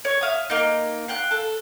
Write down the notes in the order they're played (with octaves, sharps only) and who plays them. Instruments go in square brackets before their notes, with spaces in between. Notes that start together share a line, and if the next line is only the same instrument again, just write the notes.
[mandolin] C#5
E5 F5 D#6
A#3 D#4
F5 G5 F#6
A4